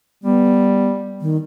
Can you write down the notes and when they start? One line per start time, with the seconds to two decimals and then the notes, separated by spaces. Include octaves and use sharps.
0.24 G3 B3
1.21 D#3